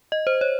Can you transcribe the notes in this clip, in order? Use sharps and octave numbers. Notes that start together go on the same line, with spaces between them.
D#5
C5
C#5